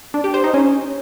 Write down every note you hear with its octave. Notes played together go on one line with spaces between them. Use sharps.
D4
G4
C5
D#4
C#4